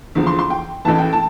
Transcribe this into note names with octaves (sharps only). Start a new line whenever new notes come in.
E2 D3 F3
C6
C6
G5
A1 A2 E3 A5
G5
A5